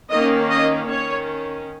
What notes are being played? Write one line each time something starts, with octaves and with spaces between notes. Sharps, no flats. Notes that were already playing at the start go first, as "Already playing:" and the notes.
D#3 A#3 C#4 D#5
D#5
D#3 C#4 C#5